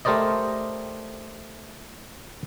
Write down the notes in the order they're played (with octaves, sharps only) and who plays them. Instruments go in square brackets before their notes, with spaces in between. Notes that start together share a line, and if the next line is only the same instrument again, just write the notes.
[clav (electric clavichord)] A3 G4 A#4 C5 D5 D#5